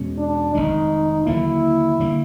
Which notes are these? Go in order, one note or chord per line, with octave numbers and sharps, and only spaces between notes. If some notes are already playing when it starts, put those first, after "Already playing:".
Already playing: E2 B2 G#3 C#4
D4
F1 D#2 D#3 G#3 D#4
D#2 D3 F#3 A#3 E4
D3 G3 A#3